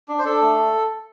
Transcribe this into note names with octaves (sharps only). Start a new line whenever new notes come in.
D4
C5
D4 A4
A3